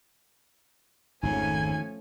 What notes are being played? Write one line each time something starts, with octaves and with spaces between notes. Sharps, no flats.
G#1 F2 G#2 D#3 F3 A3 C#4 G#5